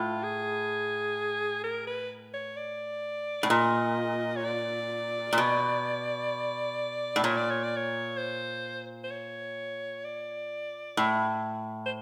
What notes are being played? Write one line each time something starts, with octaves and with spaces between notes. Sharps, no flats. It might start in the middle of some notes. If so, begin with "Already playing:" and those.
Already playing: A2 F4
G#4
A#4
B4
C#5
D5
A2
A#2 D#5
C#5
D5
A#2
B2
A2
A#2 C#5
D5
C#5
D5
C#5
C5
C5
C#5
D5
A2
C5